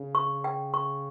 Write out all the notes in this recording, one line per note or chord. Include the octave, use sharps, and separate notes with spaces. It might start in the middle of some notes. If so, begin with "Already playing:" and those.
Already playing: C#3
C#6
G5
C#6